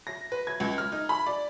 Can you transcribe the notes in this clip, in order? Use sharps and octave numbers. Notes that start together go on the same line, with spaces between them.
A#6
B4
G#6
C#2
F6
D#4
B5
D5